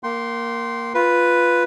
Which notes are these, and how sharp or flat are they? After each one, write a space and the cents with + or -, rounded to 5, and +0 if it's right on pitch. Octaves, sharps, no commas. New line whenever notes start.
A#3 +0 G5 -35 C6 +0
F4 +0 B4 +0